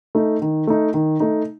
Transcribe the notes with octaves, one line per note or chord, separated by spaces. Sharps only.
A3 D#4
D#3
A3 D#4
D#3
A3 D#4